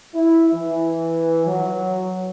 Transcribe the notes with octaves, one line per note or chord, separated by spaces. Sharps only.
E4
E3
F#3